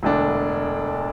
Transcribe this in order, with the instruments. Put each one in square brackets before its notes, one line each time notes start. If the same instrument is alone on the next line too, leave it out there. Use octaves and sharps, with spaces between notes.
[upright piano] E1 D2 D3 A3 D4